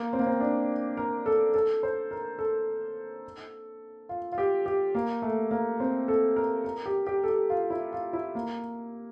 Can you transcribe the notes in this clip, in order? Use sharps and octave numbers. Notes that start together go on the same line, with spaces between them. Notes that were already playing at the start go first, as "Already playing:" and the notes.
Already playing: A#3
C4
A#3
C4
D4
A#4
A4
A4
C5
A#4
A4
F4
F4
G4
G4
A#3
A3
A#3
C4
A4
A#4
A#4
G4
G4
A4
G4
F4
E4
F4
E4
A#3